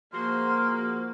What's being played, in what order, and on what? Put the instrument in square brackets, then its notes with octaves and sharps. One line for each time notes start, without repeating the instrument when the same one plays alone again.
[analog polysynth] F3 F#4 C5 [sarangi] A#3 [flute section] G#4 F6 [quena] C6